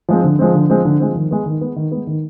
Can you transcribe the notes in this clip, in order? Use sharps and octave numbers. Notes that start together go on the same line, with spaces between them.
F3 G#3 C4
D3
F3 G#3 C4
D3
F3 G#3 C4
D3
F3 G#3 C4
D#3
G#3 B3
D#3
G#3 B3
D#3
G#3 B3
D#3